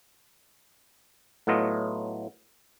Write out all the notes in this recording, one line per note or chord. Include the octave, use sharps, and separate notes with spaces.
A2 F#3 A3 B3 F4 D#5